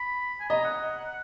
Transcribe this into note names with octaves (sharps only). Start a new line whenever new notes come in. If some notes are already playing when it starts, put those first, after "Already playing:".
Already playing: B5
G#5
D#5 A#5
F#5